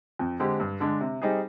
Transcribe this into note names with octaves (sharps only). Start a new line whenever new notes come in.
F2
D3 G#3 C4 G4
G2
D3 G#3 D4
C3
G3 C4 D#4 G#4